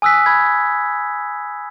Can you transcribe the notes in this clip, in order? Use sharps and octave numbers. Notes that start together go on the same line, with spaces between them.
G#5 D#6 E6 F#6 B6
B5 G#6